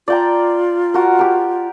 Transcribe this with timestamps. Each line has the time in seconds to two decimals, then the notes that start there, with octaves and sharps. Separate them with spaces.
0.08 F4 D5 G5 A#5
0.94 F#4 A#4
1.19 G4 A#4